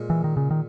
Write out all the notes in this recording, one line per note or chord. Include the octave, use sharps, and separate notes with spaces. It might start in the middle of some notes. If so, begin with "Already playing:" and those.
Already playing: A#2 G#3
E3
D#3
C#3
D#3